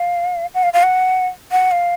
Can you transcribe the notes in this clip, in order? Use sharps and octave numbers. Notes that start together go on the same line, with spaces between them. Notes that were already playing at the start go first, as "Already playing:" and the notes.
Already playing: F5
F#5
F5
F5
F#5
F#5
F5